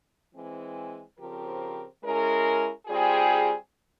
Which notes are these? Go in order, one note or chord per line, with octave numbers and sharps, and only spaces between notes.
E3 G#3 C4
C#3 F3 C4 G4 A#4
G#3 C#4 E4 A#4
G3 C4 F4 G#4